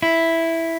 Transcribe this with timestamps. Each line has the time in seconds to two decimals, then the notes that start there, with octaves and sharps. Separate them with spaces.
0.02 E4